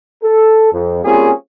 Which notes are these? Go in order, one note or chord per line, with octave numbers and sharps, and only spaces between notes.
A4
F2
G3 A#3 C4 C#4 F4 G#4